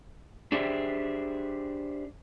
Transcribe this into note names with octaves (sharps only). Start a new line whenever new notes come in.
D4 G4 G#4 C5 E5